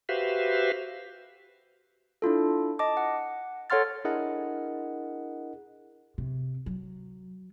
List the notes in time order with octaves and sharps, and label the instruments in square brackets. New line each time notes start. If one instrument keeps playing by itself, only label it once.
[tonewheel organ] F#4 G4 B4 C5 E5 F5
[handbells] D4 E4 F4 A4
D#5 A5 D6
F#5
A4 C#5 F#5 C6 F6 A6
[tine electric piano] D4 E4 G#4 A#4 D#5 F#5
[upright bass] C3
F#3